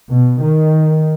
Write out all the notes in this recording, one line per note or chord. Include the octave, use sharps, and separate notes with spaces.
B2
D#3